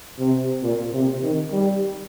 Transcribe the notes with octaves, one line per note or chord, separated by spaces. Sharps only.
C3
A#2
C3
D#3
G3